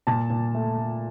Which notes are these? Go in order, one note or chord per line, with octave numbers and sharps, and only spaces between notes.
A#2 A5
A#2
A3
A3